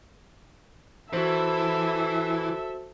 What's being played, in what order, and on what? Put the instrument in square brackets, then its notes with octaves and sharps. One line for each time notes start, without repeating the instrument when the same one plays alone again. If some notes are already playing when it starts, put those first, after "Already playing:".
[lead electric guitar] E3 [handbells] F#4 C5 [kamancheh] A4 E5